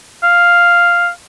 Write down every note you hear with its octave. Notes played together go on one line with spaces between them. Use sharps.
F5